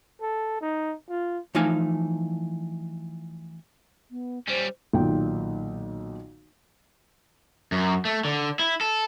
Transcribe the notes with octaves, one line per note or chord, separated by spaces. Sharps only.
A4
D#4
F4
E3 F3 A3 D#4 F5 G#5
B3
G3 C#4 C5
B1 A#2 D#3 G5
F#2
A3
D3
E4
A4